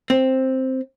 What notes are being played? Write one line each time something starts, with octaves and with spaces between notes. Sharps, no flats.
C4